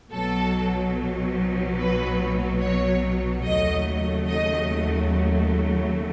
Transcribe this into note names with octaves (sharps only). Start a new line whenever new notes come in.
B1 B2 F#3 A4
B4
C#5
D#2 C#3 F#3 A3 D#5
D#5